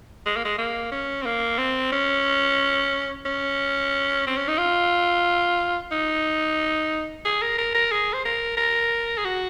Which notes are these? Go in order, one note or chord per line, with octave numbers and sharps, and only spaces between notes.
G#3
A#3
G#3
A#3
C#4
C4
A#3
C4
C#4
C#4
C4
C#4
D#4
F4
D#4
G#4
A#4
A#4
A#4
G#4
C5
A#4
A#4
G#4
F#4